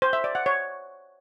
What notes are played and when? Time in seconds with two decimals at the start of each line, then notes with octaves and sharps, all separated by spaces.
0.02 C5
0.13 E5
0.24 D5
0.35 F#5
0.46 C#5